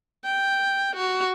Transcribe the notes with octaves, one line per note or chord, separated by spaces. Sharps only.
G5
F#4